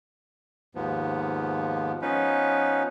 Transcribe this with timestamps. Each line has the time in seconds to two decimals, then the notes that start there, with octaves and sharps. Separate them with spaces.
0.75 D#2 G#2 F3 B3
2.02 F3 B3 C#4 D#4 B4